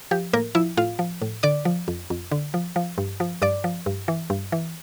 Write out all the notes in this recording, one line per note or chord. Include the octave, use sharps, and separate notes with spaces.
F3 G4
A2 A#3 A#4
F3 E4 E5
A2 F4 F5
F3
A2
D3 D5 D6
F3
F2
F2
D3
F3
F3
G2
F3
G2 D5 D6
F3
G2
E3
G2
E3